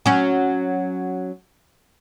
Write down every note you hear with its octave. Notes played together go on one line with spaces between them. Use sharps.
F#3 C#4